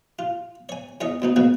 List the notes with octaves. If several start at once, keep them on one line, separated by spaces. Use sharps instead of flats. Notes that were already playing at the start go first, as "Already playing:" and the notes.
F4
C#5 G#5
E2 C#4 C#5 D#5
D2 B3 D#4
G#3 A#3 B3 C#4 F#4